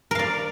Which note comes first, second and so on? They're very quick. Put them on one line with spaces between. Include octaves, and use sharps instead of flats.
A#4 F5 D5